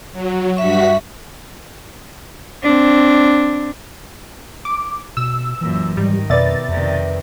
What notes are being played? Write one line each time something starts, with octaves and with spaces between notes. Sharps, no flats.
F#3
G2 F#4 E5 C#6 B6
C4 D4
D6
B2 E6
F#2 A#2 E3
G#2 D#3 G3
F2 B2 B4 D5 E5 A6
F2 C3 D#3